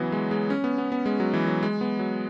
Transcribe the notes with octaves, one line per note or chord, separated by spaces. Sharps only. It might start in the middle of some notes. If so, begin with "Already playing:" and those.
Already playing: C#3 E3 F#3 B3
G#3
G#3
C#4
B3
B3
B3
G#3
F#3
E3
F#3
G#3
B3
F#3